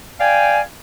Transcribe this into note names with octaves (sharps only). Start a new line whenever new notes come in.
D5 F5 G5 G#5